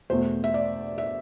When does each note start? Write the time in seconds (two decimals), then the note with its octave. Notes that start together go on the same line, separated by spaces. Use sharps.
0.10 E2 B2 A3 C5
0.44 E5
0.54 D5
0.98 E5